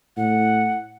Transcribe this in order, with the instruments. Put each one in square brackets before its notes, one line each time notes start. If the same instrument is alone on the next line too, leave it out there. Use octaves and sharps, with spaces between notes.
[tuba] A2 [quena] F#5